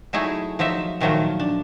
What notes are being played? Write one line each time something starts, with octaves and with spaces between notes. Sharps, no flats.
F#3 A3 D#4 E4 G#4
F3 F#3 D#4 E5
A#2 D#3 F3 F#3 A3 A#3
D4